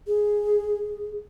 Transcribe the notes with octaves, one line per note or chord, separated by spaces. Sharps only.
G#4